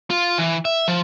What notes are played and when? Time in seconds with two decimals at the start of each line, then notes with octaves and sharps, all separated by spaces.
0.10 F4
0.38 E3
0.65 E5
0.88 F3